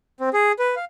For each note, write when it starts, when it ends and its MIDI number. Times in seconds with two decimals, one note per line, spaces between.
0.20 0.29 60
0.33 0.52 68
0.59 0.75 71
0.76 0.85 77